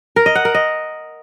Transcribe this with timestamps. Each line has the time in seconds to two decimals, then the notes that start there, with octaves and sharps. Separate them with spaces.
0.16 A#4
0.26 D#5
0.35 F#5
0.45 A#4
0.54 D#5